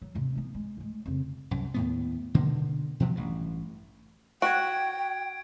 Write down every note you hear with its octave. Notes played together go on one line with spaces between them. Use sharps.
F#3
D#1 C3
B3 D#4
G#3
G#3 A3
F2 C#3
C2 F#2
D#2 A2 B3
B2 D3 D#3 A#3
B2 F3 F#3
A1 G2
F#4 G5 G#6 D7